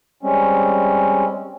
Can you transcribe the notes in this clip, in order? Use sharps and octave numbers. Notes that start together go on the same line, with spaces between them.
G3 G#3 C4 C#4